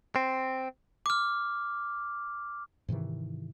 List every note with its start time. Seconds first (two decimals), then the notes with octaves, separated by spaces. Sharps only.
0.16 C4
1.06 D6 F6
2.89 G#2 C3 D#3 E3